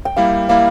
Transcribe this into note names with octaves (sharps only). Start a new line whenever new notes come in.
G5
G3 A#3 E4 F5
G3 A#3 E4 F5